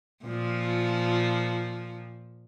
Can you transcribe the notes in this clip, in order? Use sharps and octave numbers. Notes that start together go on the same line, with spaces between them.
A#2 F3